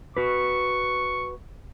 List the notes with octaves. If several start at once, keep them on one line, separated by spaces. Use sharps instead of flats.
F#4 B4 C#6